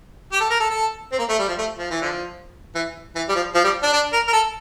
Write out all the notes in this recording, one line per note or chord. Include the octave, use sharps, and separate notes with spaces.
G4
A4
A#4
A4
A4
C4
A#3
A3
G3
F3
A3
F3
E3
D3 F3
E3
E3
G3
F3
F3
G3
D4
D4
A#4
A#4
A4